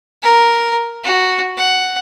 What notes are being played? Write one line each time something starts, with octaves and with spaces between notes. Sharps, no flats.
A#4
F#4
F#5